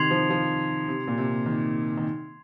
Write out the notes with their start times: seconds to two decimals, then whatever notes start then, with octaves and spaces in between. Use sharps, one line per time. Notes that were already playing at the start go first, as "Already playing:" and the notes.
Already playing: C3 D#3 C6 G#6 C7 F7
0.11 F3
0.30 F3
0.88 C3
1.08 A#2
1.18 C3
1.46 D#3
1.97 D#3